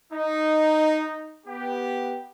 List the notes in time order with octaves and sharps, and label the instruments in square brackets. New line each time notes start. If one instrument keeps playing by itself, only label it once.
[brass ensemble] D#4
B3 G4